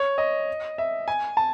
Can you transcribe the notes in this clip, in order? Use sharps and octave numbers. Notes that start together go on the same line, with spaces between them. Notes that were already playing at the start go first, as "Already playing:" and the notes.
Already playing: C#5
D#5
E5
G#5
A5